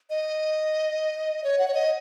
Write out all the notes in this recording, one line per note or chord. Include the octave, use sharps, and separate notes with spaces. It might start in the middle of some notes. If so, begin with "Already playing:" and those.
D#5
C#5
F#5
C#5
D#5